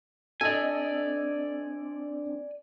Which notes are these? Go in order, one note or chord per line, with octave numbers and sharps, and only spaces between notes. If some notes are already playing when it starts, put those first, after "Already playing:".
C4 D4 A4 D5 D#5 G#5